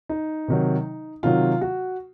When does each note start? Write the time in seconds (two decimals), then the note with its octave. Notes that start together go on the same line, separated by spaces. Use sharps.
0.09 D#4
0.48 C3 D#3 F#3
1.23 C3 D#3 F#3 F4
1.61 F#4